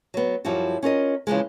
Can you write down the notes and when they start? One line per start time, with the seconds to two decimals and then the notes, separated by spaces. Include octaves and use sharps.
0.14 F#3 B3
0.45 F#2 F3 G3 E4 F#4
0.83 C#4 F4 A#4 D#5
1.27 C#3 E3 F3 G#3